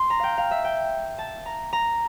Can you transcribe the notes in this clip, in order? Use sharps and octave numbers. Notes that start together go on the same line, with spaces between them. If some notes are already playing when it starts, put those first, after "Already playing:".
Already playing: C6
A#5
F5 G5
F5
E5
G5
A5
A#5
A#5